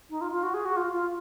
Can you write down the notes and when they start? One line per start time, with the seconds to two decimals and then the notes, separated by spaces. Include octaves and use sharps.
0.10 D#4
0.21 F4
0.32 F4
0.43 F#4
0.54 G#4
0.65 F#4
0.76 F4
0.93 F4